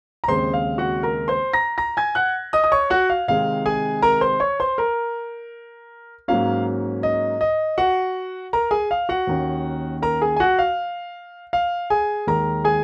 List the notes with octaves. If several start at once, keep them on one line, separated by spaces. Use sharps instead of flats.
A#5
D#2 C#3 G#3 C4 C5 C6
F5
F#4 F#5
A#4 A#5
C5 C6
A#5 A#6
A#5 A#6
G#5 G#6
F#5 F#6
D#5 D#6
D#6
C#5 C#6
F#4 F#5
F5
C3 D#3 G#3 C4 F5
G#4 G#5
A#4 A#5
C5 C6
C#5 C#6
C5 C6
A#4 A#5
G#2 F#3 A#3 C#4 F5
D#5
D#5
F#4 F#5
A#4 A#5
G#4 G#5
F5
F#4 F#5
D#2 D#3 A#3 C#4
A#4 A#5
G#4 G#5
G#5
F#4 F#5
F5
F5
G#4 G#5
D#2 D#3 G#3 A#4 A#5
G#4 G#5